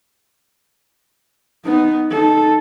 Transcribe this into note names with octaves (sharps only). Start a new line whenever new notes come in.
B3 D#4
D#4 A4